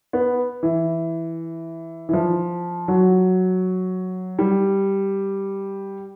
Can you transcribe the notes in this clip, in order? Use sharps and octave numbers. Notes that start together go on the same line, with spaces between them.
B3
E3
E3
F3
F#3
G3